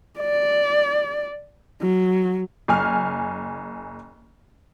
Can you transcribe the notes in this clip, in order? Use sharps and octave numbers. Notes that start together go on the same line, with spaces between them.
D5
F#3
F#1 G#5 F6